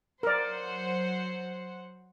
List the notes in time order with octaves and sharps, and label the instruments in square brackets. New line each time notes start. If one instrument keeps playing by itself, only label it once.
[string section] F#3 C5 F#5 [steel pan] A#4 D5